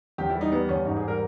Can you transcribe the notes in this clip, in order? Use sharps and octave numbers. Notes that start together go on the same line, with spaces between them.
E2 G4
E4
G3
D#4
G3 B3
E2 C#4
G#2 D#4
G#4
G3
A#4